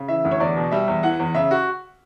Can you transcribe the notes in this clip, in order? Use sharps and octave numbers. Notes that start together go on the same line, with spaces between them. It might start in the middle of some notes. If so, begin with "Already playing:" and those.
Already playing: C#3
E3 E5
D2
C#5
E2 D5
B2
G3 E5
E2
E3 F#5
E2
C#3 E5
F#4